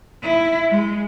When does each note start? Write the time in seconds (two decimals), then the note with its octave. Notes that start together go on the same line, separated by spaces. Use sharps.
0.22 E4
0.70 G#3